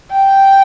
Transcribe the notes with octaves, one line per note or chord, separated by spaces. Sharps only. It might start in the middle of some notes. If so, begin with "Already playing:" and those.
G5